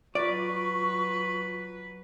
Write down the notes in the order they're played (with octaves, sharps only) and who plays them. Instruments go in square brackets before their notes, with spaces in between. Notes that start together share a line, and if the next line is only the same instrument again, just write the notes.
[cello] F#3 B4 [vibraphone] F4 [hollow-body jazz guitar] D5 [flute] C#6